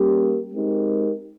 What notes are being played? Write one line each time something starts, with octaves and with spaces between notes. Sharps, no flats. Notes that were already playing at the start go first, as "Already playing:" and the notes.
Already playing: G3 A#3 C#4 G4 A#4
G#3 C4 D#4 G4 A#4